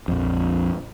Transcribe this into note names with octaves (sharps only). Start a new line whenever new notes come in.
A#1 F2